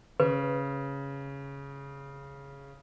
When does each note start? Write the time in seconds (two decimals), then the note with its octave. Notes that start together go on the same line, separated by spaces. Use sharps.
0.20 C#3 B4